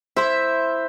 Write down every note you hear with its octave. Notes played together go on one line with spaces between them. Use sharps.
E4 C5 E5